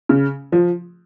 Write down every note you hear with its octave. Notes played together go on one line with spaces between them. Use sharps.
C#3
F3